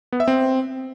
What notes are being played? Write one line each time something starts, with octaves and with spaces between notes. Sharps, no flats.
B3
E5
C4